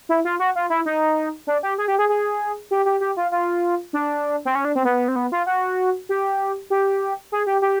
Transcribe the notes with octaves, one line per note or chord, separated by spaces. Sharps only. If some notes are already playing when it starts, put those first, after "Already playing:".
E4
F4
F#4
F4
E4
D#4
D4
G4
G#4
G4
G#4
G#4
G4
G4
G4
F4
F4
D4
C4
C#4
D4
C4
B3
C4
B3
F4
F#4
G4
G4
G#4
G4
G4